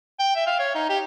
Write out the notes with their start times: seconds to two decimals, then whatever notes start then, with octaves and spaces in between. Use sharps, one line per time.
0.19 G5
0.35 E5
0.47 F5
0.59 C#5
0.75 D#4
0.89 G4